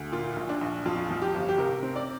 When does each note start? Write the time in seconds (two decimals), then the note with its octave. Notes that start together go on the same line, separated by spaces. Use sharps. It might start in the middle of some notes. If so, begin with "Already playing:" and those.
Already playing: D2
0.12 A#2 F4
0.36 A#1
0.49 D4
0.61 A#1
0.86 F2 F4
1.10 F3
1.22 G4
1.34 G1
1.49 G4
1.58 C3 A#4
1.83 C4
1.96 D5